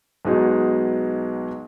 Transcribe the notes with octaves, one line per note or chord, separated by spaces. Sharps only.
B1 B2 G#3 D#4 G#4